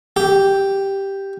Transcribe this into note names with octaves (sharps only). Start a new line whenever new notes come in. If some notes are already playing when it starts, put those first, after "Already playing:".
G4